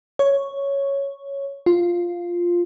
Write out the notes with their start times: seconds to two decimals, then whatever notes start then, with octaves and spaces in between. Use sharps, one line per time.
0.19 C#5
1.66 F4